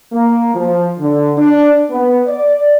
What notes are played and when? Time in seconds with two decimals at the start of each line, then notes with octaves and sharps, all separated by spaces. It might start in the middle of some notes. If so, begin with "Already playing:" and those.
0.13 A#3
0.55 F3
0.99 D3
1.37 D4
1.91 B3
2.27 D5